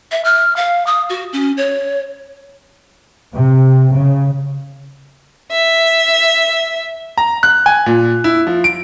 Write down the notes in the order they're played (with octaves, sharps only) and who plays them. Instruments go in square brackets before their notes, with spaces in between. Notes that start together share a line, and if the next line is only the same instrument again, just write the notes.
[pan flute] E5
F6
F5
D#6
F#4
C#4
C#5
[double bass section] C3
C#3
[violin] E5
[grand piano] A#5
F#6
G#5
A#2
E4
F3
D7